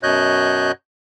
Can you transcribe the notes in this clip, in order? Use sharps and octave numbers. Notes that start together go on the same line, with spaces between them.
F#2 B2 C#5 D#5 F#6 G6